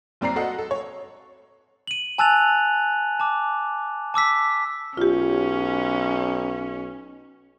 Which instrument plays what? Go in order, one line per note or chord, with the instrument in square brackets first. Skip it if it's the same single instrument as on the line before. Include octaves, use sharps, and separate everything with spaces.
[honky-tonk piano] F#1 C4 D5 A#5 C7
F#4 A4 D#5 F#5
A4
C#5
[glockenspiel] D#7 F#7
G#5 A5 E6 F#6 A6 F7
A5 D6
A5 D6 E6 B6
[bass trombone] B1 [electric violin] C#4 [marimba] F4 G4